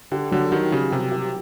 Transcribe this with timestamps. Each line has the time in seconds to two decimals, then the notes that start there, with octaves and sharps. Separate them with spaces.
0.11 D3 G4
0.31 D3 F#3
0.52 D#3 G4
0.71 C#3 G4
0.91 C3 G4
1.12 G4